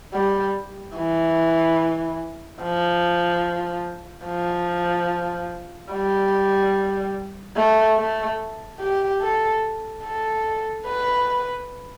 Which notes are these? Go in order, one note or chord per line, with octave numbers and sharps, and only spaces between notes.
G3
E3
F3
F3
G3
A3
A3
G4
A4
A4
B4